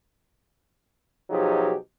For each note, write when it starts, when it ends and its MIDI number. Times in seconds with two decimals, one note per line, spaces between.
1.30 1.73 47
1.30 1.73 53
1.30 1.73 54
1.30 1.73 63
1.30 1.73 67
1.30 1.73 68